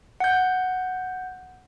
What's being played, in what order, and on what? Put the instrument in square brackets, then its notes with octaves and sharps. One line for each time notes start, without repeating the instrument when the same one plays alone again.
[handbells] F#5 G6